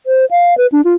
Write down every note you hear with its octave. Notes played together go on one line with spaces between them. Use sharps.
C5
F5
B4
D4
F4